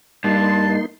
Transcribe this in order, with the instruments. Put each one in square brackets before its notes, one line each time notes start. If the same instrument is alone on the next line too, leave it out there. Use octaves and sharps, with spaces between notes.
[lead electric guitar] G2 [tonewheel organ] A#3 D#4 C6 [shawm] A5